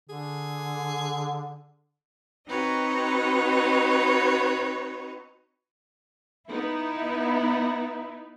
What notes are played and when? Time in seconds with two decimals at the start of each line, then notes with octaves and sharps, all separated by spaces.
0.10 D3 G#4
2.49 C4 D#4 F#4 B4 C#5 D#5
6.50 B3 D#4 E4